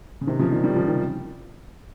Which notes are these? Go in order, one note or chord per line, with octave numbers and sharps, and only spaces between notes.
C#3
C3 D#3
C#3 F3
D#3 G3
D#3 G3
C#3 F3
C3 D#3